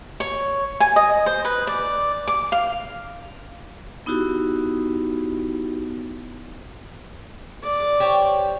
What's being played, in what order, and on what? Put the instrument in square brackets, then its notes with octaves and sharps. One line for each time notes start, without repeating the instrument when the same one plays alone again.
[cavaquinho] C#5
G#5
D#5
C5
B4
D5
D6
F5
[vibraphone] B3 D#4 E4 F#4 G4
[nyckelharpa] D5
[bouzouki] G4 C5 C#5